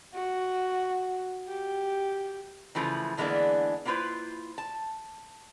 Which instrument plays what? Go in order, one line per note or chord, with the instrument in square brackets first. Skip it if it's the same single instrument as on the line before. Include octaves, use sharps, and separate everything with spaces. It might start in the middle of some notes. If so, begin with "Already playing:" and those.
[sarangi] F#4
G4
[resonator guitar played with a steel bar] C#3 E3 F3 A3
D3 E3 G#3 A#3 B3 D4
A#3 B3 E4 F4 B4 C5
A5